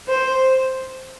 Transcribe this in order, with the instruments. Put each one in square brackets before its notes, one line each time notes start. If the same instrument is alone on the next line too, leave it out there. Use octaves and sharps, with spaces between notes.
[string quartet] C5